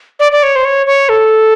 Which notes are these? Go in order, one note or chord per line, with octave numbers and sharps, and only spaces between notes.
D5
D5
C#5
C5
C#5
C#5
A4